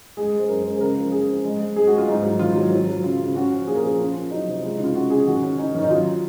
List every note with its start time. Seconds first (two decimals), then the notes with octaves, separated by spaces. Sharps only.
0.17 G#3 G#4
0.33 G#3
0.39 C5
0.48 F#2 A#4
0.65 G#3 C5
0.75 G#4
0.81 C#3 A#4
0.96 F3
1.12 F3 G#4
1.29 C4
1.45 G#3
1.59 G#3
1.76 G#3 G#4
1.87 G#3 F#4
1.97 F4
2.08 G#2 D#4
2.24 F#3
2.39 D#3 F4
2.56 F#3
2.72 F#3
2.88 F#3
3.04 C#3 F4
3.20 C#3
3.35 C#4 F#4
3.52 F3
3.67 A#2 G#4
3.75 A#4
3.83 F3 G#4
3.99 C#4 F4
4.15 C#4
4.31 F#3 D#4
4.47 C3
4.63 G#3 F4
4.74 C#3 D#4
4.84 F4
4.95 C#3 F#4
5.10 C#3 G#4
5.26 D#3 F#4
5.43 C#4
5.58 C#4 D#4
5.75 D#3
5.82 D#4
5.90 F#3 F4